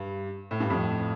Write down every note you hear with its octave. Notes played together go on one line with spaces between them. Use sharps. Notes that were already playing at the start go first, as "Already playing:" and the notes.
Already playing: G2
A2
G2
F2 A2